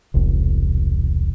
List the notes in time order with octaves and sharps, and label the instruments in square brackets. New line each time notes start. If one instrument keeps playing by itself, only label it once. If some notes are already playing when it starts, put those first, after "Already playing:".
[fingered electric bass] E1 C2